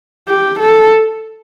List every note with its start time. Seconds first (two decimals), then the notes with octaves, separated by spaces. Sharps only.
0.28 G4
0.59 A4